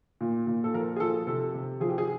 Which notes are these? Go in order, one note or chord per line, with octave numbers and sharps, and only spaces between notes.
A#2
A#2
A4
F3 A#4
G#4
F3 A4
C3 A4
C3
F3 G#4
G4
G#4